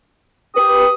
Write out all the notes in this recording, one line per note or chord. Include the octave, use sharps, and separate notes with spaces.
G4 B4 D#6